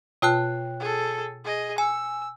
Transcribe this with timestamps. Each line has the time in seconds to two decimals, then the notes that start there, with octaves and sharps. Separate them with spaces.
0.22 B2 F4 C#5 G5 A5 F#6
0.80 G#4 A4
1.45 G#4 D#5
1.78 G#5 E6